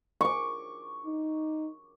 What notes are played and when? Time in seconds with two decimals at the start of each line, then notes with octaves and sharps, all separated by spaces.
0.21 C#6 D6
1.05 D#4